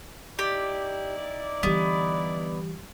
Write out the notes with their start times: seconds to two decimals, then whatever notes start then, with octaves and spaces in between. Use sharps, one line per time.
0.39 D#4 E4 G4 D5
1.63 D3 E3 G3 B3 G4